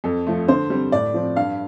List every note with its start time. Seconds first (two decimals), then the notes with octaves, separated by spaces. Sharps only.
0.04 F2 A4
0.27 F3 A3
0.48 D3 C5
0.70 G3 C4
0.92 A2 D5
1.14 F3 C4
1.36 G2 F5